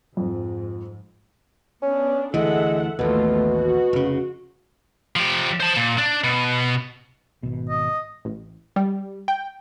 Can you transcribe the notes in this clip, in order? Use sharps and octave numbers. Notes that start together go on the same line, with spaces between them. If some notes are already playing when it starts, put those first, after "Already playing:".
F2 G#2
B3 C#4 D4
D2 E3 G#3 A4 E5 F#5
A1 D#2 B2 A3 B3 F4
F#4
F1 C#3
F3 G4
C5 A5
A#2
D4
B2
G#1 B2
D#5
A1
G3
G5